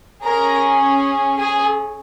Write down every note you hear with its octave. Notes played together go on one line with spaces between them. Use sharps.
C#4 G#4 A#4 A#5
G#4 G#5